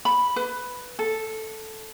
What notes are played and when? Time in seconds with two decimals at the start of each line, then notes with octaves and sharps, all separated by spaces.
0.05 B5
0.36 B4
0.99 A4